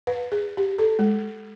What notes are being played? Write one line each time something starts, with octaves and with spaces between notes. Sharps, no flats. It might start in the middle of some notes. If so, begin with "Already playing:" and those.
B4
G#4
G4
A4
G#3